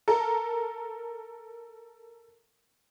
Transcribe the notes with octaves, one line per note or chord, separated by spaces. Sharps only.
A4 A#4